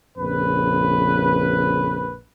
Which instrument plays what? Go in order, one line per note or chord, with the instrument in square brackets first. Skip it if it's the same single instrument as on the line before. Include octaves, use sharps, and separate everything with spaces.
[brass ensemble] A#1 F2 C#3 B4